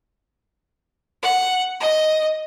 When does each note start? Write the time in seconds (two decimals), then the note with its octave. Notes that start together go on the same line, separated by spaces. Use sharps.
1.23 F#5
1.81 D#5